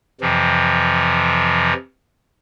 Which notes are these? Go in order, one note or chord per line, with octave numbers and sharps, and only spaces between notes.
F2 C3 E3 F3